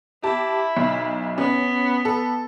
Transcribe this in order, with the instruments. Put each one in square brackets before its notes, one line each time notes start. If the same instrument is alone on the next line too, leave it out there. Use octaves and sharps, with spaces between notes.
[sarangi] E4 [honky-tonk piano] G4 A5
[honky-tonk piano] B1
[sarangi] B3 [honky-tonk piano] C#4
[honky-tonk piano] A4